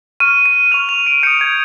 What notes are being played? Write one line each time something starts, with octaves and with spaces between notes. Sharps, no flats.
C#6 F6 D#7
D#7
C#6 F6 F7
F7
D7
D#6 G6 C#7
G#6